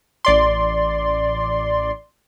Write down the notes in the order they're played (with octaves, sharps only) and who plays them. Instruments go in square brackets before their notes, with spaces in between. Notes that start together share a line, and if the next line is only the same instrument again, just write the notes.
[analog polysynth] A1 D5 C6